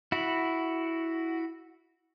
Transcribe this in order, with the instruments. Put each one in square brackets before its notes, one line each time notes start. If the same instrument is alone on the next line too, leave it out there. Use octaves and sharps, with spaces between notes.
[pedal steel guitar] E4 F#4